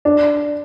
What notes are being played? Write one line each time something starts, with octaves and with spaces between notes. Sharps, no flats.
D4